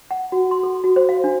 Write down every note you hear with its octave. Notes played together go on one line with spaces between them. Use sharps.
F#5
F#4
C6
A4
F#4
C5
F5
D4